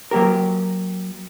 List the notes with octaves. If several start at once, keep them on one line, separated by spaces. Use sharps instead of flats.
F#3 A#3 G4 A#4